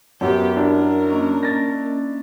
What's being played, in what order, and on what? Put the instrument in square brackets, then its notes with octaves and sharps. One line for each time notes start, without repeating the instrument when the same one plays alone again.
[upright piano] F#2 [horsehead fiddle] B3 G4 [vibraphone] F#5
[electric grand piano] D4 E4 [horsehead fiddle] A#4
[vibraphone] A#3 C#4 D#5
[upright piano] A6 A#6